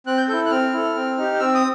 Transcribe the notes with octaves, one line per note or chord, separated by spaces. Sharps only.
C4 F#6
G6
E4 A4 G6
F#6
C4 F6
E4 A4
C4
D#4 G4
C4 E6
D#6